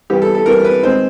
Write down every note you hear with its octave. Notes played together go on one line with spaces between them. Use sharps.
E3 G3 B3 G4
A4
A4
E3 G3 B3 A#4
B4
D#3 G#3 C4 C5